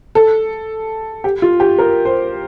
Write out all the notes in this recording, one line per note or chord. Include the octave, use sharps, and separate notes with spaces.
A4
G4
F4
G4
A#4
C5